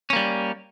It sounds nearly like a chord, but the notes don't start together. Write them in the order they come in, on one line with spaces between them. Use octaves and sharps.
C#4 A#3 G3